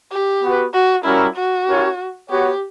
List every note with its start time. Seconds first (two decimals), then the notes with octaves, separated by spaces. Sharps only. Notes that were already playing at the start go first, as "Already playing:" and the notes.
0.11 G4
0.44 B3 F#4 B4
0.74 F#4
1.05 G3 C#4 E4 F#4 A#4
1.36 F#4
1.68 C#4 E4 G4 A#4 C#5
2.30 B3 F#4 G4 C#5